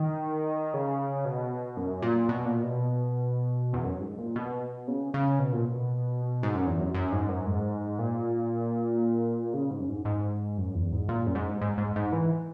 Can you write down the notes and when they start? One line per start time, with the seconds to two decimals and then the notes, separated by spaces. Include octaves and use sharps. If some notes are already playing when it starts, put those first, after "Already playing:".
Already playing: D#3
0.74 C#3
1.25 B2
1.77 F#2
2.02 A#2
2.29 B2
2.45 A#2
2.63 B2
3.73 E2
3.84 F#2
4.01 G#2
4.19 A#2
4.36 B2
4.88 C#3
5.14 C#3
5.39 B2
5.52 A#2
5.65 B2
6.43 G#2
6.55 F#2
6.67 E2
6.80 F#2
6.94 F#2
7.12 G#2
7.29 F#2
7.46 G#2
7.99 A#2
9.54 C#3
9.71 G#2
9.80 F#2
9.89 G#2
10.05 G#2
10.58 F#2
10.74 E2
10.92 G#2
11.09 A#2
11.27 F#2
11.35 G#2
11.61 G#2
11.78 G#2
11.96 G#2
12.13 E3